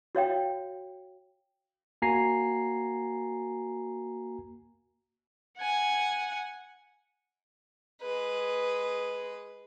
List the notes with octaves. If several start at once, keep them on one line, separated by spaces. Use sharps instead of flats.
F#4 C#5 F5 G5
A#3 F#4 G#5 A#5 C7
F#5 G#5
G#3 B4